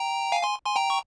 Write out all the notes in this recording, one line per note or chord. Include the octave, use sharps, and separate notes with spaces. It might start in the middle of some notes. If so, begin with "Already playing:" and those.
Already playing: G5 A#5
F5 G#5
G#5 C6
G#5 C6
G5 A#5
C#6